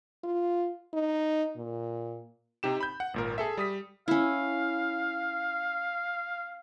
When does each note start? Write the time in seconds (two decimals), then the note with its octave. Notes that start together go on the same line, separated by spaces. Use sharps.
0.24 F4
0.93 D#4
1.56 A#2
2.63 C3 D#4 G4 E7
2.80 B5 G6
3.00 F#5
3.14 G#1 A#2 A#4
3.38 G#4 A4 E5
3.57 G3 D#6 B6
4.08 C#4 E4 F5